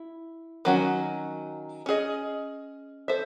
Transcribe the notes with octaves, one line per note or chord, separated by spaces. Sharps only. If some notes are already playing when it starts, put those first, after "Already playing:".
Already playing: E4
D#3 F#3 C#4 F#4
C#4 G#4 D#5
A4 C5 E5